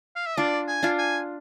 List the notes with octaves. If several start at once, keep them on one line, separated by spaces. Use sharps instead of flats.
F5
E5
D4 F4 D5
G#5
D4 F4
G#5